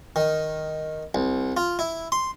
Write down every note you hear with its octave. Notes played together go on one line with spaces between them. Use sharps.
D#3
C2
F4
E4
C6